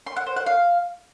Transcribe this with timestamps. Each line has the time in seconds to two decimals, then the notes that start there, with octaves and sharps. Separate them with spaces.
0.06 C6
0.16 F#5
0.26 C5
0.36 F#5
0.46 F5